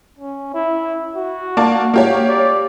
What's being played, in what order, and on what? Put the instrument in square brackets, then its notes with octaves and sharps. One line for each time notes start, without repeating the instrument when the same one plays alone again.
[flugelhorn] C#4
E4
F#4
[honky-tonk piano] A#3 D5 A5
A#3 G4 C#5
[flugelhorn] D5